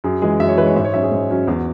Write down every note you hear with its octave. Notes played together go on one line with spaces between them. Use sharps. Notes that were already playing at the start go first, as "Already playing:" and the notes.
F#2 G#4
E3 G#3 G#4
F#2 E5
C#5
E3 G#3 B4 C#5
G#2 E5
C#5
F#3 C#4 E5
G#4
G#2
F#3 C#4
E2 F#4